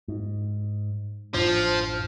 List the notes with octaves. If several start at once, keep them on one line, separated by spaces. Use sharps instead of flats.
G#2
A1 F#2 F3 D4